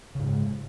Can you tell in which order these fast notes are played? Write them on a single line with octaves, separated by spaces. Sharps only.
C#3 G#2 G#3